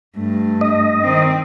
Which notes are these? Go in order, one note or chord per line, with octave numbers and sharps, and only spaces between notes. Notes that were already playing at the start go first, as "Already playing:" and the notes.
G2 A3
D#5
D#3 C4